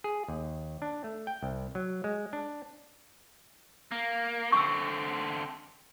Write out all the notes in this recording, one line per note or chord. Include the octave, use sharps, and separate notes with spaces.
G#4
D#2
D4
A3
G5
C2
F#3
G#3
D4
A#3
D3 C4 C#6 E6